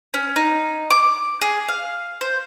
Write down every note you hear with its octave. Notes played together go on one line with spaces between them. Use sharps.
C#4
D#4
D6
G#4
F5
C5